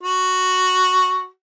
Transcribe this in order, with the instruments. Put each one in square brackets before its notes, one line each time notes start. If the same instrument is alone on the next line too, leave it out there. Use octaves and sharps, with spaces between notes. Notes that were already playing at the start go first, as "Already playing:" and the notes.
[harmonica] F#4